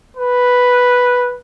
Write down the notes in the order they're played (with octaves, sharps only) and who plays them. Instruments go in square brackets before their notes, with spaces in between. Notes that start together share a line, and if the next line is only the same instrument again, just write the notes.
[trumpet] B4